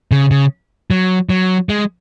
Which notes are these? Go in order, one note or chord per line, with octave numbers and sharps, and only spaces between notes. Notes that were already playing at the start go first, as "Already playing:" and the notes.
C#3
C#3
F#3
F#3
G#3